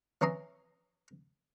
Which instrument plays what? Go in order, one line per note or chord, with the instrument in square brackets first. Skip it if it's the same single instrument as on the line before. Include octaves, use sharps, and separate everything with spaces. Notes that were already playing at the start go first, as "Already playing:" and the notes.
[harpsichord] E3 C#4 A#5 C6 D#6